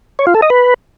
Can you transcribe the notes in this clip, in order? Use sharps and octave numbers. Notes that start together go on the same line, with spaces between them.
C#5
F4
A4
D#5
B4